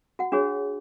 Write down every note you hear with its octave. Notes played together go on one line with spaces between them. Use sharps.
F#4 F#5
D4 F#4 G#4 C#5